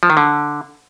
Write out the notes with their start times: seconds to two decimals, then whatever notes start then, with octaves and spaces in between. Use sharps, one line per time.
0.03 F3
0.10 D#3
0.17 D3